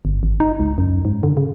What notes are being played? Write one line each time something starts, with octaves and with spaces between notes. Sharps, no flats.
G1
G#1
D#4
C#2
F#2
G#2
D3
C#3